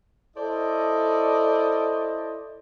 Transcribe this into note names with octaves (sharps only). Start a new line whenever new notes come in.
E4 A4 C5 D5 D#5